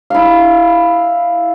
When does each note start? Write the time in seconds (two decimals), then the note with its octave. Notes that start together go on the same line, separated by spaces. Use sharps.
0.10 E4 F5